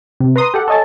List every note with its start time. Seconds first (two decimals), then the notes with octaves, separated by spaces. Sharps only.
0.20 C3
0.36 B4 A#5 C6 D#6
0.54 G4 A4 F#5
0.68 A4 C#5 D#5 G#5 A5